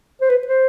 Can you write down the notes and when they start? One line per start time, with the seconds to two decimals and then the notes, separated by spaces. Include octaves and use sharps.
0.21 C5
0.30 B4
0.47 C5